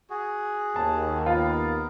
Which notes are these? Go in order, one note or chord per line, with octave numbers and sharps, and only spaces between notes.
F#4 G#4
D#2 A5
B3 F4 A#4